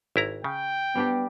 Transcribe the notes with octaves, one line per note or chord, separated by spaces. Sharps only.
G#1 E4 A#5
C#3 G5
G3 B3 D4 G4